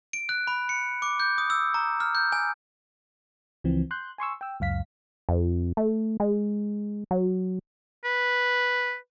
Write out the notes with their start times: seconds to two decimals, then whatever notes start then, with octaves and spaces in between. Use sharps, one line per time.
0.13 D7
0.29 F#6
0.47 B5
0.69 C#7
1.02 D6
1.20 G6
1.38 D#6
1.50 E6
1.74 A#5
2.00 F6
2.15 G6
2.32 G#5
3.64 C#2 E3 F3 C4
3.91 C6 F#6 G6
4.18 G#5 C6 C#6 E6
4.41 G5 E6
4.60 C#2 F#2 F5 B6
5.29 F2
5.77 A3
6.20 G#3
7.11 F#3
8.04 B4